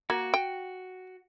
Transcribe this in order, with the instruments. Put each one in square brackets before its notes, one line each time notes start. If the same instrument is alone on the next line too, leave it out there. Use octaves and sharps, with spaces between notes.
[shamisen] A#3 [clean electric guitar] F#4
[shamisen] G5